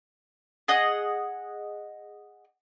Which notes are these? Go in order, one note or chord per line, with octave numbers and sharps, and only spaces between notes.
G#4 D#5 F#5 D#6